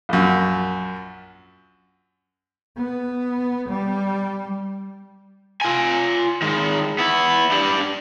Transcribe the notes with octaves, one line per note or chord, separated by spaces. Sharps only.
A#1 F#2
B3
G3
F4 G#5
D#3 G#3
B3 E4
D4 G4